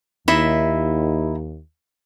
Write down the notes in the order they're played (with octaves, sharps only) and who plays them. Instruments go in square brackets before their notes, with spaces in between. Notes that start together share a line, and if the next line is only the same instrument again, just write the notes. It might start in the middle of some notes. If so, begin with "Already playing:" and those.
[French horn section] D#2 [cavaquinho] D#4 E4 E5